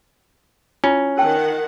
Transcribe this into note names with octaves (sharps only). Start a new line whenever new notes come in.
C#4 E4 F4
D#3 A#4 F#5 G5 A5